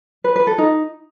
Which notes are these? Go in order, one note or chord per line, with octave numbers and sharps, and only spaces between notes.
B4
B4
A4
D#4